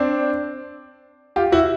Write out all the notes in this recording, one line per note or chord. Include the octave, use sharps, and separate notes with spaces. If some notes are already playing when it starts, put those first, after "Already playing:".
Already playing: C4 D4
F4 G4
E4 F#4